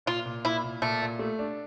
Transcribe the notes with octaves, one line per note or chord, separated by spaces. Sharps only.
A#2 F4
A#2
A#2 E4
A#2
A#2 A3
A#2
A3
D4